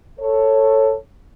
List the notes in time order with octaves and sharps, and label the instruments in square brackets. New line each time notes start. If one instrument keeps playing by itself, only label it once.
[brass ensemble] A4 C#5